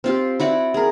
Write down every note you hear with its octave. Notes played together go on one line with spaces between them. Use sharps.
C4 F4 G4
E4 F#4 D5
G#4 A#4